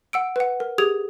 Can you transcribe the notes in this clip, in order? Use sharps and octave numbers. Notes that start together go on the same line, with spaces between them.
F#5 E6 D7
B4 F#5
A#4
G4 G#4 D#6 G#6 F7